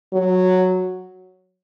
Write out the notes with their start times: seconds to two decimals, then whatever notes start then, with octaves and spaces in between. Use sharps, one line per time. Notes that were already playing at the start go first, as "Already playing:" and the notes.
0.13 F#3